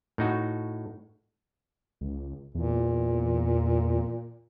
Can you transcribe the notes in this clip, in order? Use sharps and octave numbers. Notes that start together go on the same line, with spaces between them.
A2 D#4 F#4
C#2
E2 A#2